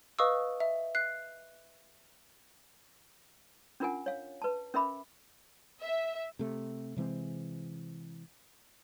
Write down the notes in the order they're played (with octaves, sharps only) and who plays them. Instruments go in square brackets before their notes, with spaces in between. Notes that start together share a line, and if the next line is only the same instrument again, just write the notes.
[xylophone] B4 D#5 F5 C#6 D#6 E6
E5
F#6 C7
[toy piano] C#4 D4 F4 A#4 F#5 G#5
C#5 F5
B4 A5
C#4 A#4 E5 B5 D6
[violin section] E5
[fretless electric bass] C3 A3
C3 E3 G#3 C4